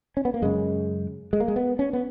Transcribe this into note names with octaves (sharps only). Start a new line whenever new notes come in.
C#4
B3
A#3
F#2 C#3 G#3
G#3
A#3
G#3
B3
C#4
B3